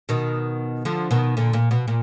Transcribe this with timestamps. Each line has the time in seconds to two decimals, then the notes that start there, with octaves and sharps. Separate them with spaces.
0.09 B2 D#3
0.85 D3 F3
1.11 B2 D#3
1.37 A#2 D3
1.53 A#2
1.71 B2
1.88 A#2